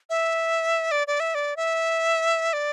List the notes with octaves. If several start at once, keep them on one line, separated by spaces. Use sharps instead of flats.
E5
D5
D5
E5
D5
E5
D5